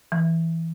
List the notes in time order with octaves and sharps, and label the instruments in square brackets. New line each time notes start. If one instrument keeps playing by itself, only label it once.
[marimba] E3